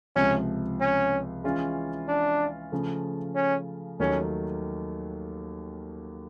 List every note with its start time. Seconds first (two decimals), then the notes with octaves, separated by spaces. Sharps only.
0.16 C#2 C3 F3 C#4
0.81 C#4
1.44 E3 G#3 C#4 F4
2.08 D4
2.72 C#3 F3 A3
3.36 C#4
4.00 D#2 D#3 F#3 A3 C#4